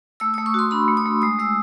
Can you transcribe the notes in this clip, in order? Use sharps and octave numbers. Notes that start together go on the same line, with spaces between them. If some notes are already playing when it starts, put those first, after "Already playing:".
A3 E6
A3 D#6
C#6
F#4 C6
D4 B5
A3
D#6
A3
G#3 D#6
G#3 E6